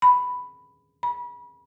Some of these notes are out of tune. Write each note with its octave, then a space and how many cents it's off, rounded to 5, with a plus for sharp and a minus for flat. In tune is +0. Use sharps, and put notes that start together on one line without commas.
B5 +5
B5 -30